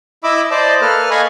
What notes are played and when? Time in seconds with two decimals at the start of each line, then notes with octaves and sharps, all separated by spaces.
0.24 E4 D#5 E5 B5 D6 E6
0.51 C5 D5 D#5 A5 D6
0.81 A#3 A4 B4 F6
1.11 D#5 F5 G#5 B5 C#6 D#6